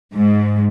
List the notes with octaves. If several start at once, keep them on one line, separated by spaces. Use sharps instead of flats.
G#2